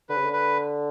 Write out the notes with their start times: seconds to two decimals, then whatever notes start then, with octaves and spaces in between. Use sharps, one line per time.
0.09 D3 B4
0.17 C#3
0.26 D3
0.33 B4